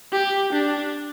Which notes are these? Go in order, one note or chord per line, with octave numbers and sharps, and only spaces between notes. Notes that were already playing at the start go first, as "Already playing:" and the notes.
G4
D4